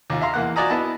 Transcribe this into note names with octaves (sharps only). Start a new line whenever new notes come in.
D#2 F4
E5 F5 A#5 C6
E2 A#3 F#5
F4 F#4 D5 G#5 A#5 D#6
B3 E4 D#5 A5